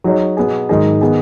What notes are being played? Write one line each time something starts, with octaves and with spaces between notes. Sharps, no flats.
F#3 D#4 G#4 C#5
B2 B3 G#4
G#2 D#3 F#3 D#4 G#4
D#3 B3 G#4